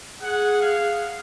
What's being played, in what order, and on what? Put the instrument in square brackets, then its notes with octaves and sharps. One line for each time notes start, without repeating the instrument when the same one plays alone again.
[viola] G#4 [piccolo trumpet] F#5
[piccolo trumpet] F5